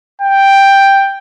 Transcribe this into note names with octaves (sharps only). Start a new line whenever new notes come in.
G5